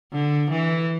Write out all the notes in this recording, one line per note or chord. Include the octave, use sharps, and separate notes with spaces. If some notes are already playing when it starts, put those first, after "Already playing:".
D3
E3